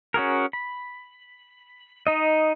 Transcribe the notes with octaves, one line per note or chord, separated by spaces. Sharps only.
C#4 F#4 G#4 A#4
B5
D#4 D#5